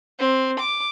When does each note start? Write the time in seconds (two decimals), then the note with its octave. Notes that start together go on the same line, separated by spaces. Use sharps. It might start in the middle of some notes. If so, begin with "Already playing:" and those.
0.20 C4
0.60 D6